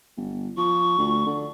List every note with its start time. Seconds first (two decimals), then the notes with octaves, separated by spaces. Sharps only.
0.17 G1
0.57 F3 C#6
0.98 D2
1.26 D3